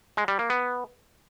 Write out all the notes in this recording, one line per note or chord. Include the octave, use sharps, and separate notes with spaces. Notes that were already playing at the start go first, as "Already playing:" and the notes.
G#3
G3
A#3
B3